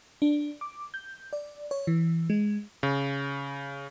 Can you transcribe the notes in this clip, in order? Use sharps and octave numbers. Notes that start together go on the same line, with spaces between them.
D4
D6
G6
D5
C#5
E3
G#3
C#3